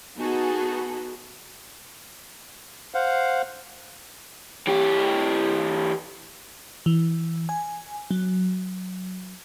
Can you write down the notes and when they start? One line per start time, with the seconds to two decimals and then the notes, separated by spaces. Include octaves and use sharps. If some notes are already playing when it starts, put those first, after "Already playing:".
0.18 B3 D#4 F#4 G#4 A4
2.94 C5 F5 F#5
4.67 E3 G4
6.86 E3
7.49 G#5
8.11 F#3